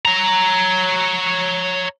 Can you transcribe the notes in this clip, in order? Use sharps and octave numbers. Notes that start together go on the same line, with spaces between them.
C#5 A#5